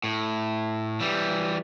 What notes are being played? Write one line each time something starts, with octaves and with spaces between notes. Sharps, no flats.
A2
E3 G3